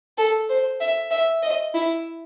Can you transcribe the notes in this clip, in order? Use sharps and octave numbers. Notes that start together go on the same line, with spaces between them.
A4
C5
E5
E5
D#5
E4